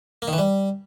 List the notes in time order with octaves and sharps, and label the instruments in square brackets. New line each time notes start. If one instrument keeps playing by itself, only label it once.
[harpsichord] A#3
D#3
E3
G3